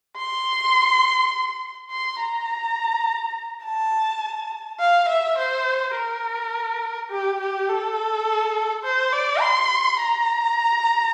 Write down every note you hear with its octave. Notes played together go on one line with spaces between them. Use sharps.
C6
C6
A#5
A5
F5
E5
C5
A#4
G4
G4
A4
C5
D5
C6
A#5